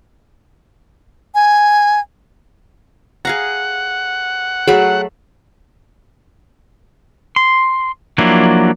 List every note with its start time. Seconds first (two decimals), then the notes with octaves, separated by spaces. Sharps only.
1.35 G#5
3.25 G#4 F5 F#5 A#5
4.68 F#3 A3 G#4 B5
7.36 C6
8.18 F3 F#3 A#3 D4 E4